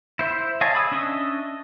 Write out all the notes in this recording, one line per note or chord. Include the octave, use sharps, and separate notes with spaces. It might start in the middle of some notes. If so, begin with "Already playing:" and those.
E4 C5 E5
C#5 D#5 F5 G#5 A5
G#4 B5 D#6 E6
C#4 D4 D#5 E5 D#6